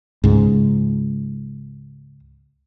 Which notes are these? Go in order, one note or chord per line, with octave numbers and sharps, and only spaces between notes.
C#2 G#2